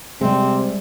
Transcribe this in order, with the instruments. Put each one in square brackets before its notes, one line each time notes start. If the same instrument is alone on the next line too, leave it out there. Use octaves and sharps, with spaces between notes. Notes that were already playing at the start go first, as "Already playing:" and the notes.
[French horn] C3 [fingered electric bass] G3 G#3 [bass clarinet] C4